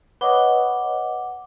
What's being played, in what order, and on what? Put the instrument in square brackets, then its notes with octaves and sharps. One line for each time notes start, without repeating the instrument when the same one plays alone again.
[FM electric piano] B4 C#5 D#5 [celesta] F#5 D6 G7